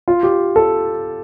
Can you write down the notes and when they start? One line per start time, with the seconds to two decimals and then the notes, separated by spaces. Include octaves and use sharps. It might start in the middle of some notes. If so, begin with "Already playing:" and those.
0.08 F4
0.23 G4
0.56 A4